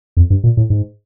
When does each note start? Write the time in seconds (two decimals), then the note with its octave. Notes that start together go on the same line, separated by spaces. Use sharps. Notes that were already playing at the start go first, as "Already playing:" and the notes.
0.17 F2
0.30 G2
0.44 A#2
0.57 A2
0.70 G#2